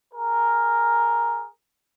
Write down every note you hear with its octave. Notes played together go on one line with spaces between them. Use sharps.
G#4 A#4